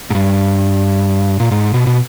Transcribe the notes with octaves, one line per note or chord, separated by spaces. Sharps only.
G#2
G2
A#2
G#2
B2
B2